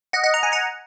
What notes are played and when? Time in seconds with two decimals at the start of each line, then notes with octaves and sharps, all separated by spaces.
0.13 D#5 F#5
0.24 D#5 F#5
0.34 A#5
0.43 G#5
0.52 F#5 A#5